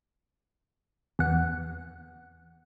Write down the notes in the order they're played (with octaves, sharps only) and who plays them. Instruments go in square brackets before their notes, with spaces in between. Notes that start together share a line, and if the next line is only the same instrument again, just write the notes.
[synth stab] E2 F#5